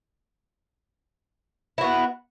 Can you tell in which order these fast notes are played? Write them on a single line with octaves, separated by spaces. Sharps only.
E4 F#4 B3